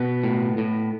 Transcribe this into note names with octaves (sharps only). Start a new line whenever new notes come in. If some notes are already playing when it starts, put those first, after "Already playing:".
Already playing: B2 B3 B4
A2
A2